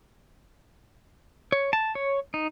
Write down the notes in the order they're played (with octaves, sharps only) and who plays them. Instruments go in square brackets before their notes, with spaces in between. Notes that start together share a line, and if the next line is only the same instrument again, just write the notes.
[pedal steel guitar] C#5
A5
C#5
D#4